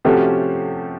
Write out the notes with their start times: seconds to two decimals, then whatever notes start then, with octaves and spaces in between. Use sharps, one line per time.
0.05 C3 F3 A3 C#4 F#4 G4 A4